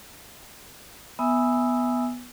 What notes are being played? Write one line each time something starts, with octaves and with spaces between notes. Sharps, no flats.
B3 E5 G#5 D#6 E6